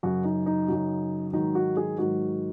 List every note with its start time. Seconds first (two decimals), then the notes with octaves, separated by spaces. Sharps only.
0.03 F#2 C#3 F#3 F#4
0.24 D#4
0.46 D#4
0.68 F#2 C#3 F#3
1.33 G#2 D#3 F#3 D#4
1.55 F#4
1.77 G#4
1.98 G#2 D#3 F#3 F#4